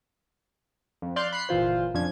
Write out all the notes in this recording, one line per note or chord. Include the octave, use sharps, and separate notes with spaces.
F2
D5 F5 C6 F#6 G6
B5 F#6 C7
G1 A#2 E3 F4 C5
F2 F3 C#4 D4 G#6